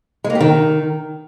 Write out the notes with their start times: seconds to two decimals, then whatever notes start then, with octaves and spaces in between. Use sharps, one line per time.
0.24 G#3
0.30 A#3
0.35 G4
0.41 D#3